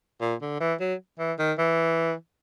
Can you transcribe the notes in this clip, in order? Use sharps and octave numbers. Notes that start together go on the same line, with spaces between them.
A#2
D3
E3
F#3
E3
D#3
E3